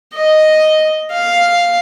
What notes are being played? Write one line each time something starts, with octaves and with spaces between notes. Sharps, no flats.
D#5
F5